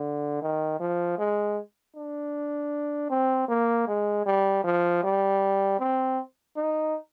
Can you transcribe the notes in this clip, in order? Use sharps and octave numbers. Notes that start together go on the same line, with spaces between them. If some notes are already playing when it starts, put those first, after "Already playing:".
Already playing: D3
D#3
F3
G#3
D4
C4
A#3
G#3
G3
F3
G3
C4
D#4